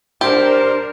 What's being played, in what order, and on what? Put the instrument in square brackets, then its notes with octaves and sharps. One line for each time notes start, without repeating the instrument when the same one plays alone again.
[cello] D4 A#4 [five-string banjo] G4 [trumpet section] C5